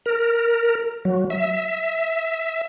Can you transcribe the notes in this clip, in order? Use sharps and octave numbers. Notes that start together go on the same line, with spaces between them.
A#4
F#3
E5